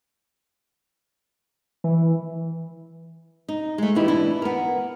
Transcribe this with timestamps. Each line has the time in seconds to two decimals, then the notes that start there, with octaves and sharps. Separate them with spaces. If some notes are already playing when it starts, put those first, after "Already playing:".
1.84 E3
3.48 D#4
3.78 G#3 A3
3.95 A#2 E3 D#4 E4 G4
4.08 E3 D4 E4
4.42 B3 A#4